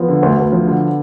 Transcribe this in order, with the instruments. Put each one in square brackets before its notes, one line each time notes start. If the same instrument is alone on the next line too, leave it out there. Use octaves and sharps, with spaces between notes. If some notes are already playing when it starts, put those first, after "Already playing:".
Already playing: [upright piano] F3 [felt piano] B3
[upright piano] D3
D2
D2
F3
D3